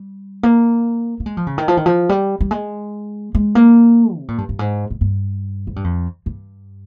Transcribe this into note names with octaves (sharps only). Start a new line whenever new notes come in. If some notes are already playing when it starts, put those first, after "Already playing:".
Already playing: G3
A#3
A#3
G#3
F3
C#3
D#3
F3
D#3
F3
G3
G3
G#3
G#3
A#3
C3
A#2
G2
G2
G#2
G#2
G2
G#2
G2
F2
G2